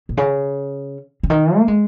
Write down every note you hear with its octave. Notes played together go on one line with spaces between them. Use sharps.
A#2
C#3
C#3
D#3
A#3
G#3